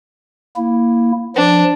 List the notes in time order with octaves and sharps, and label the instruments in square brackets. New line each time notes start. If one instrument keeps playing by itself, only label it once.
[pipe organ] A#3 E4
[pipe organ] F3 [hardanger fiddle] D4